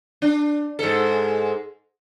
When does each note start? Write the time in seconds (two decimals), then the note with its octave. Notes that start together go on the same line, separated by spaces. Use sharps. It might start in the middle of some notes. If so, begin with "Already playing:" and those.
0.22 D4
0.79 G#2 G#3 A4